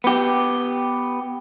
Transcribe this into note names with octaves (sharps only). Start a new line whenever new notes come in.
B3 G4